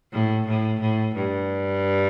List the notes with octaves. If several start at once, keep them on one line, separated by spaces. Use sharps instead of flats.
A2
A2
A2
G2